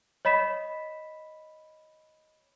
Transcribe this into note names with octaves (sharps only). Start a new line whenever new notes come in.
C#5 D#5 B5 B6 E7